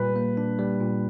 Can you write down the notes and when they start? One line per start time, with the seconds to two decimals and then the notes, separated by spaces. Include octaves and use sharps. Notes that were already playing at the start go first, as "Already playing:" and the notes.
Already playing: A#2 G3 B4
0.16 A#3
0.37 D4
0.59 G3
0.81 A#2